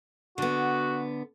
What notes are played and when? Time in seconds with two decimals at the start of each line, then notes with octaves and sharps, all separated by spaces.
0.38 D3 B3 F#4